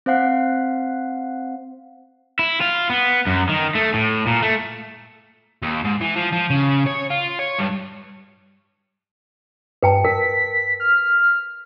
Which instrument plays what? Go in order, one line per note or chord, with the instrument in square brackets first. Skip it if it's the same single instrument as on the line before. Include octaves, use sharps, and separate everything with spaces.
[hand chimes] C4 C5 F5 F#5
[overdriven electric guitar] E4
F4
B3
F#2
D#3
A3
A2
A#2
A3
D#2
G#2
E3
F3
F3
C#3
C#5
F4
C#5
G2
[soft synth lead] G2 [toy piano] B4 G5 A5
[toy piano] A#4 [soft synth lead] B6
[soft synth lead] F6